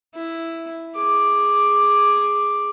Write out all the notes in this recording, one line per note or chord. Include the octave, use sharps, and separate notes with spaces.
E4
G#4 D6